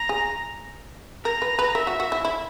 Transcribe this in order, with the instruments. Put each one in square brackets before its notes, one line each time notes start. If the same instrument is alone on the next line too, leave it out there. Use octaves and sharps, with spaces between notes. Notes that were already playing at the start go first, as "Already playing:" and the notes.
Already playing: [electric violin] A#5
[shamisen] G#4
[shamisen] A#4 [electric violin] A#5
[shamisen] B4
B4
[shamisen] A#4 [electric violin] E5
[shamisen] F#4
F#4
E4
E4